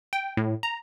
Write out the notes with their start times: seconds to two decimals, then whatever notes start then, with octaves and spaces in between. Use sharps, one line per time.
0.13 G5
0.37 A2
0.63 A#5